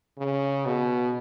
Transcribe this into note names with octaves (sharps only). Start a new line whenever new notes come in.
C#3
B2